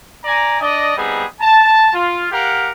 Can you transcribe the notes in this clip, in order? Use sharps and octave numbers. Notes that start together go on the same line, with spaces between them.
D5 G#5 A#5
D4 D5 D#5
G3 B3 C4 D#4 G#4
A5
F4
G4 A#4 F5 F#5